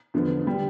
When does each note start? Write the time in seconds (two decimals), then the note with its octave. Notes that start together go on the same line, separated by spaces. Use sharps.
0.14 E2 D3 F3 B3
0.46 D3 G3